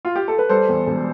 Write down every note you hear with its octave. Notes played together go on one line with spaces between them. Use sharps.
F4
G4
A4
B4
G3 A4 C5
E2
E1